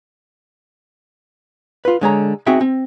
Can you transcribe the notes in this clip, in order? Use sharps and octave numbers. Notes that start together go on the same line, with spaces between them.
F4 B4
D3 G#3 C#5 A#5
C4 D#4 F#4 G#4 E5 G5
C4